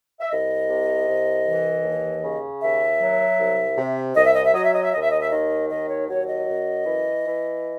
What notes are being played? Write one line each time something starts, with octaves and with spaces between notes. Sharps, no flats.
E5
C2 D#5
C3
C2
E3
D#2
C#3
D#2 E5
F#3
C2
C3
C2 D#5
E5
D#5
E5
F#3 D#5
E5
D#5
E5
D#2 D#5
E5
D#5
E5
D#3 D#5
D#2 D#5
C#5
F#3 C#5
D#5
F#2
E3
E3